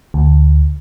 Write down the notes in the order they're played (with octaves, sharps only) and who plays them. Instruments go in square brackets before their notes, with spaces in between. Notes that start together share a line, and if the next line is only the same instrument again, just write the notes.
[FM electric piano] D2